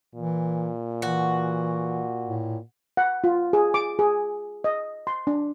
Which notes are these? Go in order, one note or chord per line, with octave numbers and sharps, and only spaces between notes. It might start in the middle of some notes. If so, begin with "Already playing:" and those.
A#2 E3
E3 F#4
A2
F#5
F4
G#4
D6
G#4
D#5
C6
D4